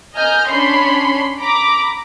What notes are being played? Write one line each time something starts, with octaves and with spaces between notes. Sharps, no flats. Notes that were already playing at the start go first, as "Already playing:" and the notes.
D#5 G#5 A#5 F6 G6
C#4 D4 C#5 B5 C6 C7
A#5 B5 D6